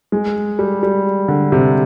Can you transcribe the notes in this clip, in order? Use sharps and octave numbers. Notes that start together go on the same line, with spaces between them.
G#3
G3
G3
D3
C3